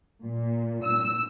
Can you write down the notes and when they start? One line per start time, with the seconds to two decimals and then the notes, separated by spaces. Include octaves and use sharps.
0.23 A#2
0.84 E6